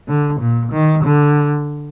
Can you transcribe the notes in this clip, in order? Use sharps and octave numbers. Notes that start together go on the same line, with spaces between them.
D3
A#2
D#3
D3